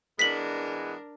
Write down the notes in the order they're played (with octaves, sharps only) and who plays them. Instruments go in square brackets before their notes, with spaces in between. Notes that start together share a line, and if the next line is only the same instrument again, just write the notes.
[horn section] E3 G#3 B3 [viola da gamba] D4 A#4 [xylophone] B6 F#7